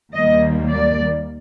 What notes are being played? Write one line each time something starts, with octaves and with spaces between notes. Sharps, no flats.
D#2 D#3 G3 A#3 D#5
D5